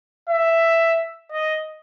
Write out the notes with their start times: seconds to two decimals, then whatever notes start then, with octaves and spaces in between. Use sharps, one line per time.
0.30 E5
1.32 D#5